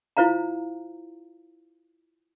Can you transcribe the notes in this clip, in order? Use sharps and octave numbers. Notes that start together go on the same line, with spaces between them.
E4 F4 C5 F5 A#5